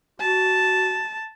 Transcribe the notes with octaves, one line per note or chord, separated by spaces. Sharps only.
F#4 A5